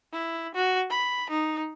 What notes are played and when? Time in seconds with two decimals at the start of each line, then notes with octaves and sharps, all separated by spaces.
0.13 E4
0.55 F#4
0.90 B5
1.30 D#4